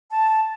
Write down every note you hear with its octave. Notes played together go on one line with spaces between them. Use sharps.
A5